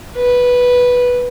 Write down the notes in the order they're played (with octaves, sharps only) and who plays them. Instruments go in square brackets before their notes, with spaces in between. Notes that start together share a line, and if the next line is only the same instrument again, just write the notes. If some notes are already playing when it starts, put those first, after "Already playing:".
[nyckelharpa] B4